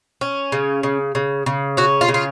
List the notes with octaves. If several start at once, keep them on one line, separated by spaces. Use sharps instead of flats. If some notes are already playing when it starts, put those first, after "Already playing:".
C#4
C#3
C#3
C#3
C#3
C#4 F#4
F4
C#3
F4